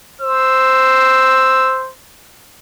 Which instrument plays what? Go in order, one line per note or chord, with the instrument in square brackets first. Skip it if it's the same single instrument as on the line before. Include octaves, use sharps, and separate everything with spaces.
[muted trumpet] C5 [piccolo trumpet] E6